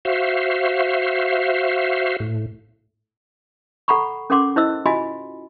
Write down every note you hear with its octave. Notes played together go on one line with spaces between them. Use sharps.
F#4 C5 E5 F5
A2
A4 F#5 A#5 B5 C#6
C#4 A4 A#4 F#5 C6 D6
E4 C5 D#5 E6
F4 F#4 D#5 G#5 B5